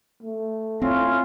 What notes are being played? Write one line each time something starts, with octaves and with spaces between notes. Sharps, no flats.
A3
C4 C#4 E4 F4